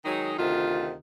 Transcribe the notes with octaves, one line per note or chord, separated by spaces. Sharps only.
D#3 F#3 G#3 D#4
D2 C3 D#3 F4